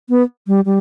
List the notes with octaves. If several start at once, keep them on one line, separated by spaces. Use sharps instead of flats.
B3
G3
G3